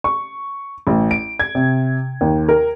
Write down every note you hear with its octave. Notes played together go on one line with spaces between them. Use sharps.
C#6
A1
D7
G#6
C3
D#2
A#4